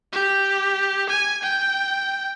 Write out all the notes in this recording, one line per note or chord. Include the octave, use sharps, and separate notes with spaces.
G4
G#5
G5